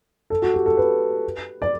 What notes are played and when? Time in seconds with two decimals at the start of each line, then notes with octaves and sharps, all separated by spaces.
0.30 A4
0.42 F#4
0.54 G4
0.66 A4
0.77 B4
1.62 D5